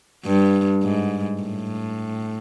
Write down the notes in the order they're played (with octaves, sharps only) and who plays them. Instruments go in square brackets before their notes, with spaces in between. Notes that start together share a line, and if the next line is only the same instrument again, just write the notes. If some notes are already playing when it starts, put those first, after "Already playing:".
[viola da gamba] G2
G#2
A2